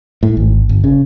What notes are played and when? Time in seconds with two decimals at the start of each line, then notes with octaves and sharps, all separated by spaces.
0.23 A2
0.37 G#1
0.69 G1
0.84 C#3